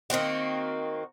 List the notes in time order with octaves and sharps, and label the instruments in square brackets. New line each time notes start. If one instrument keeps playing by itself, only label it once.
[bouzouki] D#3 A#3 C4 F#4